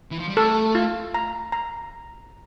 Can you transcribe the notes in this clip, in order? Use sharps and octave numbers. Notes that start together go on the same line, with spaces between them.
E3
F3
G3
A3 A4
F4
A#5
A#5